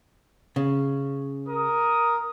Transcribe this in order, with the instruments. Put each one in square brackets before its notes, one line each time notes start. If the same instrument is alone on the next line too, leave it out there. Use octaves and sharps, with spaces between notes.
[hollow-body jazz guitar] C#3
[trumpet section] A#4 D#6